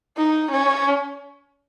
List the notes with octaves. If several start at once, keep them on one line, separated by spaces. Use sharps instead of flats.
D#4
C#4